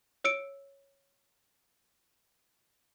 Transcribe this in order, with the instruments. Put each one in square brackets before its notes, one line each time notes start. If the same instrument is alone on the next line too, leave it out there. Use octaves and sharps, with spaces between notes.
[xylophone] C#5 E6 C#7 D7